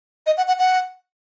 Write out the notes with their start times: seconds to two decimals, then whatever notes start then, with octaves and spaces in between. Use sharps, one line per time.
0.27 D#5
0.37 F#5
0.48 F#5
0.59 F#5